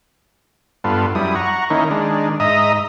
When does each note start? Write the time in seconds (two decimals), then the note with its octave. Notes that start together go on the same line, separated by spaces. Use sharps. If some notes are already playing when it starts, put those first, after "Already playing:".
0.84 G2 B3 F4 A4
1.15 F#2 G3 E4 D#6
1.35 F#5 A#5 C#6
1.70 D#3 A#3 C#4 D#4 E4
1.91 D#3 G#3 D4
2.40 G#2 D#4 D#5 E5 A#5 D#6